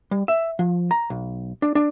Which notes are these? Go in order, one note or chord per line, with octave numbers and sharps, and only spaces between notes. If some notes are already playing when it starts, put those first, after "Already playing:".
G3
E5
F3
A#5
B1
D4
D4